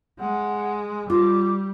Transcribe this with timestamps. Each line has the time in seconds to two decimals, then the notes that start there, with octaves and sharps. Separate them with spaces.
0.20 G#3 F#5
1.10 G3 F4 D6